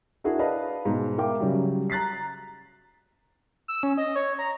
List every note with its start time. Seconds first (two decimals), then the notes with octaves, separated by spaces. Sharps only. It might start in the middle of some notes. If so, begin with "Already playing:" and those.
0.24 D4 E4 F#4 G#4 A#4
0.39 B4 D5 D#5 F5 A5
0.85 G#2 B2
1.18 A#4 E5 F5 G5 D6
1.40 C#3 F#3 G3
1.90 A#5 F#6 A6 B6 C7
3.68 E6
3.83 C#4
3.97 D#5
4.16 C#5
4.39 A#5